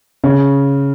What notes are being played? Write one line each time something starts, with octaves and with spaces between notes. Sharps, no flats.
C#3